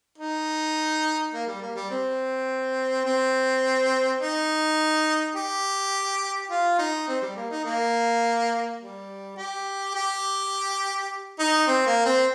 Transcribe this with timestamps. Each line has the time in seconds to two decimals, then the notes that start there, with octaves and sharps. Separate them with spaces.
0.18 D#4
1.33 A#3
1.47 G3
1.62 A#3
1.75 G3
1.90 C4
3.05 C4
4.20 D#4
5.36 G4
6.50 F4
6.78 D#4
7.08 C4
7.22 G3
7.36 A#3
7.50 D#4
7.65 A#3
8.80 G3
9.37 G4
9.95 G4
11.39 D#4
11.67 C4
11.86 A#3
12.05 C4